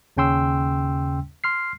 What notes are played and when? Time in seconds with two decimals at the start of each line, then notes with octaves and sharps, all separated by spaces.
0.17 D#2 C#3 C#4 G5 C6 E6
1.44 C6 F6 C7